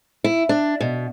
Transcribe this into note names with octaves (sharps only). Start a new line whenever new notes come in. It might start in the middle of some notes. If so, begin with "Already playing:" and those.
E4
D4
B2